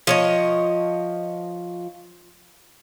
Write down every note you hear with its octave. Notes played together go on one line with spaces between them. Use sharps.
F3 C#5 D#5